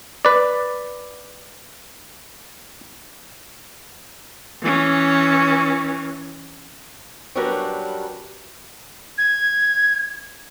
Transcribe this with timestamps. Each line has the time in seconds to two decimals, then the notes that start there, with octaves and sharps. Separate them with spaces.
0.25 B4 D5
4.63 E3 C#4
7.35 F#3 G3 C#4 D4 A#4 B4
9.18 G#6